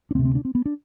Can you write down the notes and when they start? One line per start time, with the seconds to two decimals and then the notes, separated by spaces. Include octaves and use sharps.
0.11 D4
0.15 D2 C4
0.19 C3
0.25 C4
0.35 D4
0.45 C4
0.55 B3
0.66 D4